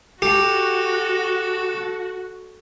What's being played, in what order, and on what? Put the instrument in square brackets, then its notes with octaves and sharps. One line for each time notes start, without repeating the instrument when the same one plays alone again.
[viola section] F#4 [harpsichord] G4 [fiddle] A4